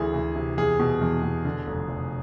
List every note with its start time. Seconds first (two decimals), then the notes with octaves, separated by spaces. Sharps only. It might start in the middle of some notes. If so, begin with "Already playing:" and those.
Already playing: D2 E3 G#4
0.14 D2
0.36 C3
0.57 E2 G#4
0.80 B2
1.01 E2
1.23 B2
1.45 D3
1.67 F1
1.89 F1